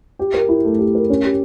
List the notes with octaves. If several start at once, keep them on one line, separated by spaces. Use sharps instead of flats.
G4
A#4
E4
A3
G4
A#4
C#4
G4